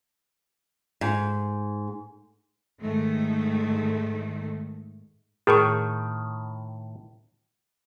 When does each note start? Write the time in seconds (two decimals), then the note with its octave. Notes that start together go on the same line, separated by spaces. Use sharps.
1.01 G#2
2.80 G#2 D#3 A3
5.47 A2 D#3 G#4 A#4 C#6